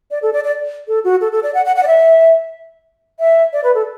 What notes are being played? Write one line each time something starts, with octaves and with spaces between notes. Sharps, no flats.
D5
A4
D5
D5
A4
F#4
A4
A4
D5
F#5
F#5
F#5
D5
E5
E5
D5
B4
A4